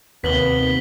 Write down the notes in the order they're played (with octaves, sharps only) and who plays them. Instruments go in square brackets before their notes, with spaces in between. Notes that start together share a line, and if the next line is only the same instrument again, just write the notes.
[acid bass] D#2 [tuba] C3 [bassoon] B3 [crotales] B6 F#7 G7